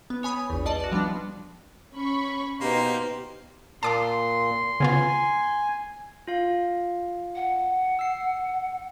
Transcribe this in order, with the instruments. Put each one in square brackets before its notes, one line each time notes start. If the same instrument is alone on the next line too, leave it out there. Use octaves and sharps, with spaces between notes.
[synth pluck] B3
C#5 G#5 B5 D#6
A#1 E2
G2 D5 D#5 A5
F#4 D5
F3 G3 B3 D4
[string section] C#4 B5 C#6
[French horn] B2 [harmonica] A#3 C6 [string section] D#4 [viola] G4 C5
[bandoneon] A#2 [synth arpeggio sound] A5 D6 D#6 [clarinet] C6
[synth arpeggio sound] C#3 B3 F4 [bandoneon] G#5
[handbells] F4 F5
[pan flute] F#5
[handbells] E6 C7